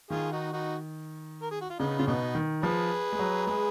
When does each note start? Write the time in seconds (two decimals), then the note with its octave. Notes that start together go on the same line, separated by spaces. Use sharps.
0.10 D#3 F4 G#4
0.32 D#4 F#4
0.52 D#4 F#4
1.42 A#4
1.51 G#4
1.61 F#4
1.70 F4
1.79 C#3 B3 D#4
1.99 C#3 F4
2.07 B2 B3 D#4
2.35 D#3
2.63 F3 G#4 B4
3.12 G#3
3.19 F#3
3.47 G#3 G#4 B4